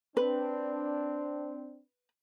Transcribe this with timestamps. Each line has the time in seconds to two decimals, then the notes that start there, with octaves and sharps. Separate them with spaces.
0.17 C4 D4 B4